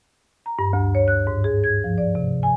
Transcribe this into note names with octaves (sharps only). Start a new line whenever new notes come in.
A#5
G2
D2
C#5
F#6
G#2
G#4
G#6
F3
D5
C3
G#5